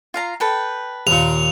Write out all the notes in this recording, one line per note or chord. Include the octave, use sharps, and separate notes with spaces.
F4 F5 A#5
A4 B4 G5
D#2 A#2 F7